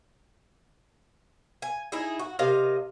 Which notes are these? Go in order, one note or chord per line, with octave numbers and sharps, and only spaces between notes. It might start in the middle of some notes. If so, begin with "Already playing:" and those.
G#5
D#4 E4 G#4
F#4
C3 A#4 D#5 F5